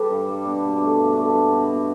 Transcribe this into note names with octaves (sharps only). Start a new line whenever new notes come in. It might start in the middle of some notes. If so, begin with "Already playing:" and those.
Already playing: G3 G4 A4 B4
G2
G3
B2 D4
B2
D4
A3
G2
A3 D4
B3
G2
B2 D4
B2